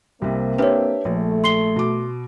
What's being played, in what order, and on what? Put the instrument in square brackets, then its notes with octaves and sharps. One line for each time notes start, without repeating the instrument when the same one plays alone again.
[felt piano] C2 C3 [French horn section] A#3 C4
[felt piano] D4 G4 E5 [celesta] B4 C#5
[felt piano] A#1 [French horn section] A3
[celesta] C6 C7 G7
[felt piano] B2 D6